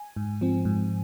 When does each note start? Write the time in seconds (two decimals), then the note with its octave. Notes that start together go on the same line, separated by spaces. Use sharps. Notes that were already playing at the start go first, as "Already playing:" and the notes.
Already playing: G#5
0.16 G#2
0.41 F3 C4
0.65 G#2